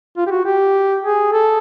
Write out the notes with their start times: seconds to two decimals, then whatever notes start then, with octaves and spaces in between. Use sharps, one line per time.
0.17 F4
0.27 G4
0.31 F#4
0.45 G4
1.03 G#4
1.33 A4